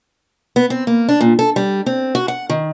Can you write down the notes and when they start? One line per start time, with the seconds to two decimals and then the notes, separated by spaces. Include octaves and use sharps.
0.56 B3
0.70 C4
0.87 A#3
1.09 D4
1.21 A#2
1.39 A4
1.56 G3
1.86 C4
2.15 F#4
2.28 F#5
2.50 D#3